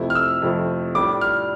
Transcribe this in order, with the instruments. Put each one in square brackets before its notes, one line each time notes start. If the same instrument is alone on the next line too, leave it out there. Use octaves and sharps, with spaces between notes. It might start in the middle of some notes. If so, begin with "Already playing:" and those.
Already playing: [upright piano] F2 C3 F3 A3 E4
[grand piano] F6
E6
[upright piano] F2 C3 F3 A3 E4
[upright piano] A2 G3 D4 F4 [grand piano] D6
[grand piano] F6